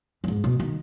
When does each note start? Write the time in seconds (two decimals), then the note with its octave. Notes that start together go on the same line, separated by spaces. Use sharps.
0.24 F#2
0.28 G#2
0.44 B2
0.60 D#3